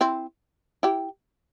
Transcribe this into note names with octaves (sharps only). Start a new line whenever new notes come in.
C4 E4
E4 G4